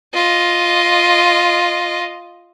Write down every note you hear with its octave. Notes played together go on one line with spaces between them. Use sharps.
F4 D#5